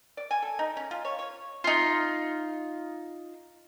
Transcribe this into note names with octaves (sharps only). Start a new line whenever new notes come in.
D5
G#5
A4
D#4
C#4
F4
C#5
C#5
D#4 F4